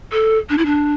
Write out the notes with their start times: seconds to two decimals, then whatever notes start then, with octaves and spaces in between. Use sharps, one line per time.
0.12 A4
0.50 D4
0.58 E4
0.66 D4